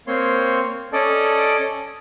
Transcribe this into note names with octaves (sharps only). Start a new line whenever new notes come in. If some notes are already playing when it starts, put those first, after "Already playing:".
A#3 C4 C#5 C6
C#4 A4 D5 D#5